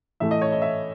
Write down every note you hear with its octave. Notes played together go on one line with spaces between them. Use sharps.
A2 E3 A3 E5
D#5
C#5
D#5
E5